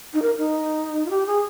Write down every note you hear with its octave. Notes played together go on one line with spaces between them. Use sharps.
D#4
A#4
D#4
F4
G4
G#4